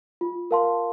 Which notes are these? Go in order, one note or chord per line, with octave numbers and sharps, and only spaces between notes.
F4
A#4 F5 A5 C6